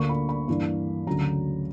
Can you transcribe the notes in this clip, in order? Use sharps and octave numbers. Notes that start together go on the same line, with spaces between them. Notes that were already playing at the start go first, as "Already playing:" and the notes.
Already playing: D2 D3 A#3 C#6
B5
B5
G2 E3 A#3
D2 C#3 F#3 A#5